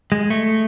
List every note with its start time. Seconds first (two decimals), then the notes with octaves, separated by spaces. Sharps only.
0.12 G#3
0.30 A3